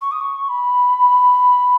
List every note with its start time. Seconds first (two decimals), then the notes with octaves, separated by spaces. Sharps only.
0.01 C#6
0.11 D#6
0.20 C#6
0.49 B5